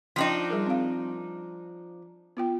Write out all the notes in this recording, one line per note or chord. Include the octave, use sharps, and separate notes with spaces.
F3 D4 D#4 G5 C6
G3 G#4 A#4
C4 F5
B3 F4 G5